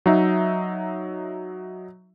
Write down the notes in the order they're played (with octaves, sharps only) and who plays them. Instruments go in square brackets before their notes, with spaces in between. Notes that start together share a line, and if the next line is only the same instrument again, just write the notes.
[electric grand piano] F#3 D#4 E5